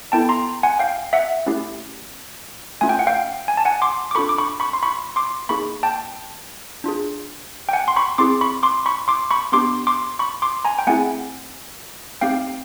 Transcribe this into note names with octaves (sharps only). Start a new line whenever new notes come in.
B3 E4 A4 G5 A5
A#5 C6
F#5 G#5
F5 G5
E5 F#5
A3 C#4 E4 G4
A3 C#4 F4 G#5
G5
F#5
F5 G5
G#5
A5
F#5 G#5
C6 D6
D6
D4 F4 A4 B5 C#6
D6
B5 C#6
B5 C#6
C6
B5 C#6
C6 D6
A#3 D#4 G#4 B5 C#6
G5 A5
D4 F4 G#4
G5
F#5 G#5
C6
B5 C#6
C4 E4 G#4 C6 D6
B5 C#6
C6 D6
B5 C#6
C6 D6
B5 C#6
B3 D4 G4 C6 D6
C6 D6
B5 C#6
C6 D6
G#5 A#5
G5
A3 C4 E4 G#4 F#5 G#5
A3 C4 D#4 G4 F5 G5